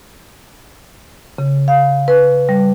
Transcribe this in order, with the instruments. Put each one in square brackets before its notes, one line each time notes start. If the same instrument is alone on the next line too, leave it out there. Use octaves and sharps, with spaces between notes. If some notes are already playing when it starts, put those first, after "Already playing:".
[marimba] C#3
F5
B4
G3